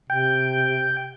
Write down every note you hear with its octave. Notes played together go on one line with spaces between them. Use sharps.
C3 G5